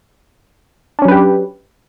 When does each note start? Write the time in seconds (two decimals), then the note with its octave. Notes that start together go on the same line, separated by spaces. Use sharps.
0.99 D4
1.02 C#4
1.05 F#3
1.08 B4
1.12 G4